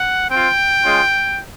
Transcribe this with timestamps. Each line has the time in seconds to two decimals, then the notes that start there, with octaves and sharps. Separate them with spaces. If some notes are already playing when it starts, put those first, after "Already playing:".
Already playing: F#5
0.29 C4 F4 G5
0.82 G#3 C#4 F4